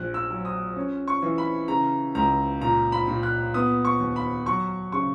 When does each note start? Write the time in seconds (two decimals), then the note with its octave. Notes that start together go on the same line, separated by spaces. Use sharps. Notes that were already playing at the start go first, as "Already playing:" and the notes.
Already playing: A#1 F#6
0.14 E6
0.30 F#3
0.45 D#6
0.76 C#4
1.08 C#6
1.22 E3
1.38 B5
1.68 C#3 A#5
2.15 C#2 A#5
2.61 A#2 A#5
2.92 B5
3.07 A#2
3.23 F#6
3.54 B3 D#6
3.85 C#6
4.00 D#2
4.16 B5
4.46 F#3 C#6
4.92 C#3 C#6